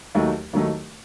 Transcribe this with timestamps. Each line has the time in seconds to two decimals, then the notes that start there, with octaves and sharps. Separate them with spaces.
0.15 D#2 D#3 F#3 A3 D#4
0.53 D#2 D#3 F#3 A3 D#4